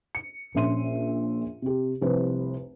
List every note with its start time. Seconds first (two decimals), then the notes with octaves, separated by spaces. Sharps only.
0.15 C#7
0.54 A#1 A#2 C#4 E5 C6 D#7
1.62 C3 G4
2.01 F1 C2 B4 C5